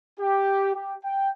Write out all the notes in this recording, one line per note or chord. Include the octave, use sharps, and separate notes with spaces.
G4
G4
G5